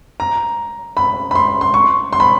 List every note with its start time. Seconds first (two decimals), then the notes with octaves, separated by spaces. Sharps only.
0.20 A#5
0.97 B5
1.31 B5
1.35 C6
1.61 C6
1.74 C#6
2.13 C6
2.20 B5